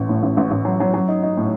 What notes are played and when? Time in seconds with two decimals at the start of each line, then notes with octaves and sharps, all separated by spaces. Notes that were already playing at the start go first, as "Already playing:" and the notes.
Already playing: A1
0.09 A2
0.23 A1
0.37 A1
0.51 A1
0.65 F#3
0.80 F#3
0.94 F#3
1.08 D#4
1.23 D#4
1.37 A2